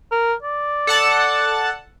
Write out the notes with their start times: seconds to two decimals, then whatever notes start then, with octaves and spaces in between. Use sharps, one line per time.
0.11 A#4
0.42 D5
0.87 A4 F#5 A5